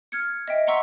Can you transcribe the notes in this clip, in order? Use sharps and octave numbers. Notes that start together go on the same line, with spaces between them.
F6 G#6 C#7
D#5 E5 G5
F#5 A#5 C6 C#6 E6 B6